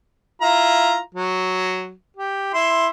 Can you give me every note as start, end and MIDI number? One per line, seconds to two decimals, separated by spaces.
0.42 0.98 64
0.42 0.98 65
0.42 0.98 82
1.14 1.91 54
2.16 2.53 67
2.54 2.88 64
2.54 2.88 84